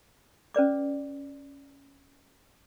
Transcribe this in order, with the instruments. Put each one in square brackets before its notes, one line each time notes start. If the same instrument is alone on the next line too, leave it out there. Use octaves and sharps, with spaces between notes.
[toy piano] C#4 B4 D5 D6